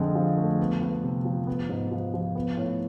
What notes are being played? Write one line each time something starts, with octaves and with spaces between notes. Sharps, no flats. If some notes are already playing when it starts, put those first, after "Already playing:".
Already playing: F2 D3 G#3
F3
A3
B3
B3
C3
F3
B3
G#2
F3
F3
B3
A2